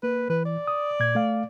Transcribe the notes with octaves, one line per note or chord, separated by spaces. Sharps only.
A#3 B4
E3 B4
D5
D#6
A#2 G#6
A3 F5